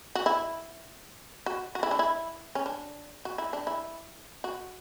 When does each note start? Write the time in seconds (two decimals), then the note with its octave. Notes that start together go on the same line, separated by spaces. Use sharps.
0.15 F#4
0.26 E4
1.46 F#4
1.75 F#4
1.83 E4
1.91 D4
1.99 E4
2.55 C#4
2.66 D4
3.25 F#4
3.38 E4
3.53 D4
3.67 E4
4.44 F#4